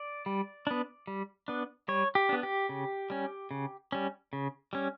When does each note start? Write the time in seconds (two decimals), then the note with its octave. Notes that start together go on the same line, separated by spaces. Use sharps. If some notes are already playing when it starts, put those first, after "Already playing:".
Already playing: D5
0.26 G3
0.67 B3 D4
1.07 G3
1.48 B3 D4
1.88 G3 C#5
2.15 G4
2.29 B3 D4
2.43 G4
2.69 C#3
3.10 G3 C#4
3.51 C#3
3.92 G3 C#4
4.33 C#3
4.73 G3 C#4